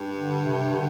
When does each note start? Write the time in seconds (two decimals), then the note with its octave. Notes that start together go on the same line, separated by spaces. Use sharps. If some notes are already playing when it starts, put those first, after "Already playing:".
Already playing: G2
0.16 D3
0.44 C3
0.73 D3